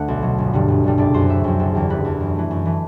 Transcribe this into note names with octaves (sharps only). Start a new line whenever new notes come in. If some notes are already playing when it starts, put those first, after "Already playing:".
Already playing: D2 D3 A3 F#5
B1
B2 F#3
G1
G2 D3 G3
G1
G2 D3 G3
F#1 D5
F#2 F#3 C5
F#1 E5
F#2 F#3 G5
F#1 A4
E2 D3 G4
F#1 B4
E2 D3
F#2
E3 A3
F#2
E3 A3